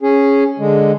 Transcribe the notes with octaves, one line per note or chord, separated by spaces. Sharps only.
C#4 G#4
D3 G#3